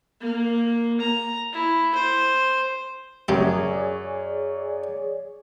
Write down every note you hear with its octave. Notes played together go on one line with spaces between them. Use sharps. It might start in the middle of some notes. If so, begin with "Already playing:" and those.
A#3
A#5
E4
C5
F#2 C#3 A3 G4 G#4 C#5 D5